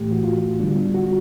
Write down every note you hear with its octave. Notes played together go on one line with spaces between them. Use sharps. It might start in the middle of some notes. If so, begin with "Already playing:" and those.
Already playing: A2 E3 A3 G4
F#4
F4
D3 G3 B3 D4
F#4